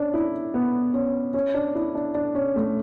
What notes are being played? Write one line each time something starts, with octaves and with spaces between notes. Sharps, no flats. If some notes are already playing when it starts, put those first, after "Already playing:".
Already playing: C#4 D4
E4
B3
C#4
C#4
D4
E4
D4
D4
C#4
A3